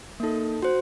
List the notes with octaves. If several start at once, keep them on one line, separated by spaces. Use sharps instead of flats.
A#3 D#4 A4
F#4 C5